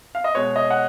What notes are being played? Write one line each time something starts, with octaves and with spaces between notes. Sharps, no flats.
F5
D#5
B2 G#3 C#5
D#5
F#5